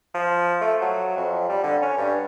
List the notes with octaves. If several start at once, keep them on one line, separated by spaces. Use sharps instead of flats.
F3
A3
F#3
F2
G3
D3
C#4
G2